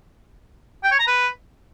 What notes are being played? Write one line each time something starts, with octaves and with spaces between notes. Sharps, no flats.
G5
C#5
A#5
B4